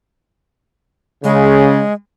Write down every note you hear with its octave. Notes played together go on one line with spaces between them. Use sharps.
C#3 G#3